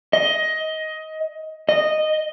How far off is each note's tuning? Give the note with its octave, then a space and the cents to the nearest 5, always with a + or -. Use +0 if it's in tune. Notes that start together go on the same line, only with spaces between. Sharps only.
D#5 +15
D#5 -10